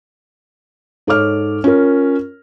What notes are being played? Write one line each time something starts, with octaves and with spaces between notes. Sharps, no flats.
G#2 A4 C#5 D6 F6
C#4 F4 A#4